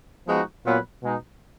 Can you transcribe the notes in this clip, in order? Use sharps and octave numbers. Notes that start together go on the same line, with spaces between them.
F3 G#3 B3 D#4 F#4
A#2 F#3 B3 F4 B4
B2 G#3 D#4